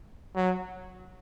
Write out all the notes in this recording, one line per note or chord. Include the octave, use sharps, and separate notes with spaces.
F#3